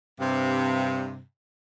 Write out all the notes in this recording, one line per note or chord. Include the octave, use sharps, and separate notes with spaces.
G2 C3